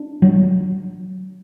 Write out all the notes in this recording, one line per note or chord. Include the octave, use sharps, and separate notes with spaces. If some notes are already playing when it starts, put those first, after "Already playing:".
Already playing: D4
F#3